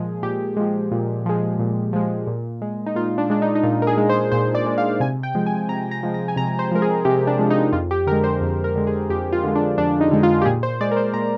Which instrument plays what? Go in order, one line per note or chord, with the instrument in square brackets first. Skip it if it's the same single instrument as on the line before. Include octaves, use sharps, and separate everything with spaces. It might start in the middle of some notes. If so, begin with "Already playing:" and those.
Already playing: [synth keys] A#2 F3 G#3 G#4
A#2 G4
F3 G#3
A#2
F3 G#3
A#2
F3 G#3
A#2
G#3
D#4
A#2 F4
D4
G#3 D4
D#4
D#4
A#2 F4
A#4
G#4
G#3
C5
A#2 C5
D5
G#3
F5
C3 G#5
G5
F3 G#3
G#5
C3 A#5
A#5
F3 G#3
A#5
G#5
C3 A#5
C5
F3 G#3 A#4
G#4
C3 G4
D4
F3 G#3
D#4
F2 F4
G4
D3 A#4
G#3
C5
F2
A#4
D3 G#3
G#4
F2 G4
F4
D3 G#3
D4
F2 D4
D#4
D3 G#3
F4
G4
A#2 G#4
C5
G#3 D5
A#4
C5
A#2 A#5